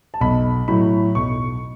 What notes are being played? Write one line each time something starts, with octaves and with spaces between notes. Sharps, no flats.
A5
B1 B5
A2 F#3 B5
B1 C#6